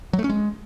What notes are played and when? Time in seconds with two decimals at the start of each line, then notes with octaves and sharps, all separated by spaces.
0.13 F#3
0.19 A3
0.24 C#4
0.30 G#3